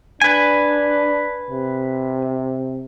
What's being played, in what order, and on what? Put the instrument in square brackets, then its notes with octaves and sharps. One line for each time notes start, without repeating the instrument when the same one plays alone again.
[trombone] D4 [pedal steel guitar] B4 G#5
[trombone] C3